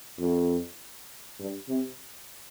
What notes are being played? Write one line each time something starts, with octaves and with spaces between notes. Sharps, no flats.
F2
G2
C3